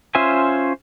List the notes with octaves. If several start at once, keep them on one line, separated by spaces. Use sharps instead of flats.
C#4 F4 C5 E5 G#5